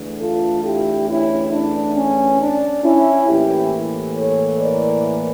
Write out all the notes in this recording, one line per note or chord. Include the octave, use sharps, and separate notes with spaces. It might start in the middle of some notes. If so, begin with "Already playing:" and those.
Already playing: E2 D3 A3
F4 A4
E4 G4
C#4 E4
D4
C#4
D4
C#4 E4
A2 E3 A#3 E4 G4
A4 C#5
A#4 D5